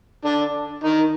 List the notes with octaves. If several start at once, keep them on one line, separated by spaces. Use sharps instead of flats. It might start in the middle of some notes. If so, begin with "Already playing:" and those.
D3 D4
D#3 D#4